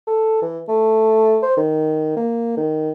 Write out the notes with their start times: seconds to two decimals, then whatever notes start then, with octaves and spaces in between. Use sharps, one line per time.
0.07 A4
0.42 E3
0.68 A3
1.42 C5
1.57 D#3
2.17 A#3
2.57 D#3